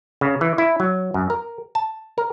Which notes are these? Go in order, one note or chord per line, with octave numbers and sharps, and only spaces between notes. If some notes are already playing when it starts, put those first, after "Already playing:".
C#3
E3
E4
F#3
F#2
A#4
A5
A#4